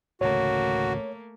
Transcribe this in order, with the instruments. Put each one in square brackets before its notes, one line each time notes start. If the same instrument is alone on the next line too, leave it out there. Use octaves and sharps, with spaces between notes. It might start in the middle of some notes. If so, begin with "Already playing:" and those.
[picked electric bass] A1 D2 C#3 [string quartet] A3 A#3 [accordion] F#4 [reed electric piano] C#5